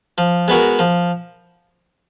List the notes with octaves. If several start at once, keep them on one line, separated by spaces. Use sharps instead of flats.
F3
G#3 B3 F#4 A#4
F3